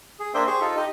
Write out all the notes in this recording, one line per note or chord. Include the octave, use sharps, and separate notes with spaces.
G#4
A#3 D4 C5 E5 G5
G4 G#4 C5 C#6
D#4 F4 A4
D#4 G4 D#5